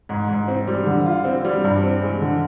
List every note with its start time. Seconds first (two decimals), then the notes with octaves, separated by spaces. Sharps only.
0.09 G#2
0.28 G#2
0.48 C4
0.68 G3
0.86 D3
1.06 F4
1.24 C4
1.45 G3
1.64 G2
1.83 C4
2.02 G#3
2.22 D3